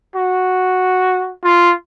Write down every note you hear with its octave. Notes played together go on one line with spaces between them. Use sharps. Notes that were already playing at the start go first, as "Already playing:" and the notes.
F#4
F4